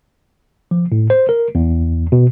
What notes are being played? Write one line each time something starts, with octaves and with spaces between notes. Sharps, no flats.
F3
A2
C5
A#4
E2
B2